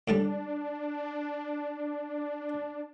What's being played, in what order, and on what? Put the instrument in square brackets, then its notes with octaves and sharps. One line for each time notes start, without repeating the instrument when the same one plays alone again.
[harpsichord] A2 D3 G3 [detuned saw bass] D4